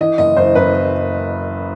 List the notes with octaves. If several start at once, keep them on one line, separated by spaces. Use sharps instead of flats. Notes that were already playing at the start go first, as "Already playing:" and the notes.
E3 D#5
F#1 D#5
F#1 C5
F#2 B4